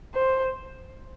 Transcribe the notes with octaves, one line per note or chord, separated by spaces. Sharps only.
C5